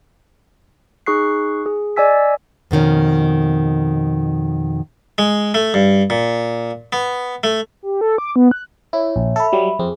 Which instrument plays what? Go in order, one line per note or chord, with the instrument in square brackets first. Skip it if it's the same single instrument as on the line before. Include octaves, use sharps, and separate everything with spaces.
[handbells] D#4 G#4 C#6 F#6 C7
G#4
D5 D#5 G#5 E6 B6
[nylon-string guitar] F2 B2 D#3 C#4
[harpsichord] G#3
A3
G2
A#2
B3
A3
[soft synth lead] G4
A4
D6
B3
F#6
[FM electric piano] E4 [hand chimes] C#5 E5
[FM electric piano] A#1
[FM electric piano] A4 [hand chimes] E5 B5
[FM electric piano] F#3 G3
[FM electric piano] F2 C4 [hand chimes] G#4